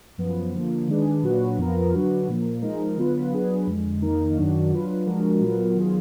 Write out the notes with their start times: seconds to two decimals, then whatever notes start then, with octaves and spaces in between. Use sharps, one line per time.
0.18 F#2 F3 B3
0.53 D3 F3 A#3
0.88 D#3 G#3 D4 G#4 B4
1.23 A#2 F#3 D4 F#4 B4
1.58 F2 F3 B3 F4 A#4
1.92 D3 F#3 D4 F#4 B4
2.28 A#2 F3 A#3
2.62 F3 G#3 D#4 A#4
2.97 D3 F#3 B3 F4 B4
3.32 F#3 B3 D4 G#4 B4
3.67 F2 D3 G#3
4.02 F2 D#3 A#3 D#4 A#4
4.36 F#2 D#3 F#3 D4 F#4
4.71 F#3 D4 F4 B4
5.06 F3 G#3 D4 F#4 A#4
5.41 A#2 F#3 B3 F4 A#4
5.76 D#3 F#3 B3 F4 G#4